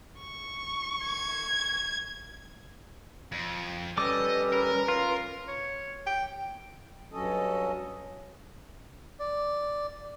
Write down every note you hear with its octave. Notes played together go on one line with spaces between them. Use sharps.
C#6
G#6
F2
G3 C#4 A4 B4 D#5 D6
A#4
F4
C#5
G5
G2 F#3 C#4 A4 D#5
D5